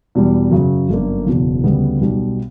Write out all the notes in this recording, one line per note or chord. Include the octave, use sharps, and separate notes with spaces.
E2 B2 G3
F#2 C#3 F#3
G1 F#2 D3 A#3
F#1 E2 B2
D2 C#3 G3 B3
B1 B2 G3